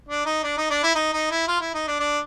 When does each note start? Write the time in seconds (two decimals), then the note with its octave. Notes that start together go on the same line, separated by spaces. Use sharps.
0.09 D4
0.26 D#4
0.43 D4
0.57 D#4
0.70 D4
0.83 E4
0.95 D#4
1.13 D#4
1.31 E4
1.48 F4
1.61 E4
1.74 D#4
1.88 D4
2.00 D4